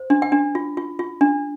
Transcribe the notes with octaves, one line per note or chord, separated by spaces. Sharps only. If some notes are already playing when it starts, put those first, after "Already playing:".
Already playing: C5
D4
G5
D4
F4
F4
F4
D4